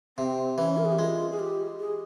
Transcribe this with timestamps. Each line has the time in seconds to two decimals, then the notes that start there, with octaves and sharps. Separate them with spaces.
0.18 C3 C4
0.58 E3 C#4
0.77 A#4
0.85 G#4
0.92 G4
0.99 G#3 F4
1.31 G#4
1.39 G4
1.79 G#4